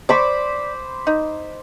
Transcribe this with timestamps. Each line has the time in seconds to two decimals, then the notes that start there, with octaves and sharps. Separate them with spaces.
0.09 C5 D5 B5 C#6 D6
1.07 D#4